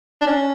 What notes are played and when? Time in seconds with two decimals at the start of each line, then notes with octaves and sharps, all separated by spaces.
0.21 D4
0.26 C#4